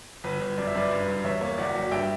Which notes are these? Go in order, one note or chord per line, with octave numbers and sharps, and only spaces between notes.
G1 B4
G1
F#2 D5
E5
F#2 B4 D5
G2 B4
G2
E2 C#5 E5
A#3 C#5 E5
F#1 D5 F#5
F#3
G2 E5 G5